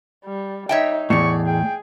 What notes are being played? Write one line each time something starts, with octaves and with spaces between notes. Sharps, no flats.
G3
D#4 C#5 E5 G5
E2 A2 D5 C#6
G#4 G5